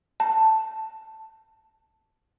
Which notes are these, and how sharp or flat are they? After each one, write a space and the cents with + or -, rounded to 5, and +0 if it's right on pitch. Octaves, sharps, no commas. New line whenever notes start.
A5 +5